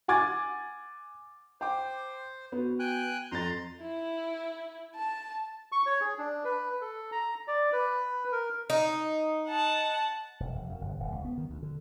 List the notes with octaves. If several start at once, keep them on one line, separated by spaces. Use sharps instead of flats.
F#5 G#5 D6 G#6 A6
C5 G5 D6
B3 F#4
G5 G#5 F#6
F2 A#5 C6 A6
E4
A5
C#6
C#5
G#4
D4
B4
A4
A#5
D5
B4
A#4
D#4
F#5 A5
E1
F1
F#2
G1
D1
C#2
B3
D#3
D2
D3